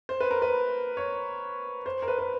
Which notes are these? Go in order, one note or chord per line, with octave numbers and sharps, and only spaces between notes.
C5
B4
A#4
B4
C#5
C5
A#4
B4
B4